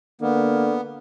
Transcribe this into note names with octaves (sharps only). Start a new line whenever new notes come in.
D3 A#3 B3